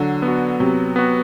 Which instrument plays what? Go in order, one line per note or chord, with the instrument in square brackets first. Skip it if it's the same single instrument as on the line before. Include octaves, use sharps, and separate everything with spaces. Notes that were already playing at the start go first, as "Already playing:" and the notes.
Already playing: [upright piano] D3 [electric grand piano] F#3
[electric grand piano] B3
F#4
[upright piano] C3 [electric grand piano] F#3
[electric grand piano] B3 F#4